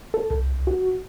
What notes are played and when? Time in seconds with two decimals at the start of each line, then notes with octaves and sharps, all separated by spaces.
0.14 A4
0.31 C2
0.67 F#4